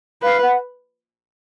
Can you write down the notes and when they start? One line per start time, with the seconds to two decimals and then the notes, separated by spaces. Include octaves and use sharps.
0.22 B4 F5
0.42 F#5